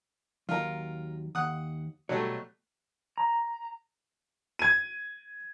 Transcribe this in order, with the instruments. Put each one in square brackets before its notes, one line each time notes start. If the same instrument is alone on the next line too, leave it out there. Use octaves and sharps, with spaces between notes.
[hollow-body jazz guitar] D#2 F#3 [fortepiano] F4 A#4
[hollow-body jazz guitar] D#2 [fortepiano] F#5 D#6
[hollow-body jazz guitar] B2 C#5 [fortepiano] F#3 G3 A3
[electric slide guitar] A#5
[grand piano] G#6 D#7